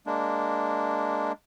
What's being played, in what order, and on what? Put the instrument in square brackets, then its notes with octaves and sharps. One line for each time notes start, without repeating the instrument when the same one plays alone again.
[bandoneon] G#3 A#3 D4